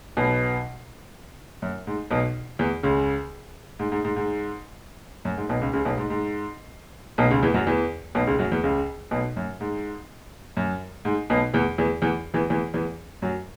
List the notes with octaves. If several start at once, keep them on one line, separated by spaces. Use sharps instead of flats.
B1 B2
F#2
G#2
B1 B2
E2 E3
C#2 C#3
G#2
G#2
G#2
G#2
F#2
G#2
B1 B2
C#2 C#3
C#2 C#3
B1 B2
G#2
G#2
B1 B2
C#2 C#3
E2 E3
F#2 F#3
E2 E3
B1 B2
C#2 C#3
F#2 F#3
E2 E3
C#2 C#3
B1 B2
F#2
G#2
F#2
G#2
B1 B2
E2 E3
E2 E3
E2 E3
E2 E3
E2 E3
E2 E3
F#2 F#3